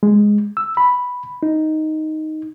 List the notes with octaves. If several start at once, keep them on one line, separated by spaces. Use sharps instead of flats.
G#3
E6
B5
D#4